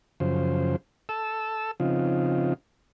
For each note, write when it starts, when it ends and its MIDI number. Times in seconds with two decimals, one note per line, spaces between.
0.20 0.76 42
0.20 0.76 49
0.20 0.76 53
0.20 0.76 72
1.09 1.71 69
1.09 1.71 81
1.09 1.71 88
1.80 2.54 49
1.80 2.54 53
1.80 2.54 60
1.80 2.54 63
1.80 2.54 65